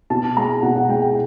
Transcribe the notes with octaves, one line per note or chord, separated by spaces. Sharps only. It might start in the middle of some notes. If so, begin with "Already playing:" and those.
B2 A5
G#3 A#5
B2 F#5
F#5
G#3 G5
G5